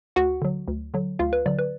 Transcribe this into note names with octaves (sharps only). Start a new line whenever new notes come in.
D2 F#4 F#5
D3 F#3
D2
D3 F#3
D2 F4 F5
B4
D3 F#3 D5
B4